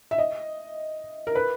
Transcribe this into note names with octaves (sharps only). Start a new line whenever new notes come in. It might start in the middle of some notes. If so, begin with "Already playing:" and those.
E5
D#5
A#4
B4